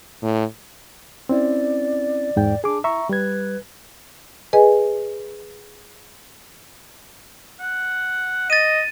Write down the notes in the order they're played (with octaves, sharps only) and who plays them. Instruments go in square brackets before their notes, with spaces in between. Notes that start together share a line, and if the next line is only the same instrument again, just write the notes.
[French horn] A2
[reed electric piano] C4 C#4 E4 [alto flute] D5
[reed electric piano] E2 G#2 G5
[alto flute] D4 [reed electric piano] G#4 D6
[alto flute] E4 [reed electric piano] E5 A#5 C#6
[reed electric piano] G3 G#6 [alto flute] B4
[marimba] G#4 B4 D#5 G#5
[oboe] F#5
[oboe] D#5 [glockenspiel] A6 D#7